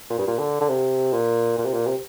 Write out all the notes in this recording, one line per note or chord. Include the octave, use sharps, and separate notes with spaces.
A#2
G2
A#2
D3
D3
C3
A#2
A#2
C3
A#2
C3